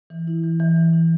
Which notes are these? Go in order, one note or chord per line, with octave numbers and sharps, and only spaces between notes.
E3
E4
E3
E3
E3
E3